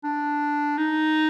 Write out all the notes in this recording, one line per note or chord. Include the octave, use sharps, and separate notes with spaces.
D4
D#4